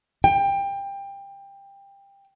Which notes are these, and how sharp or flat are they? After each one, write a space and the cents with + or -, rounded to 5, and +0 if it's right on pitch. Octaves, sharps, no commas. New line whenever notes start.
G5 +20